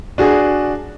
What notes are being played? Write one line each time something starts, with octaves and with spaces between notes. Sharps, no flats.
D4 F#4 G#4